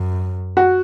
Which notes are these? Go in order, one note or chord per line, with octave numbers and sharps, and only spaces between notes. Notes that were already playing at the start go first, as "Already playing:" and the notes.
Already playing: F#2
F#4